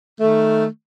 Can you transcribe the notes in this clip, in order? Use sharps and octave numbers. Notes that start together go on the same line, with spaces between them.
D#3 A3